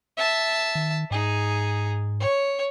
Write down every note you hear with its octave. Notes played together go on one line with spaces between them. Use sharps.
E5 A5
D#3
G#2 D#4 G#4
C#5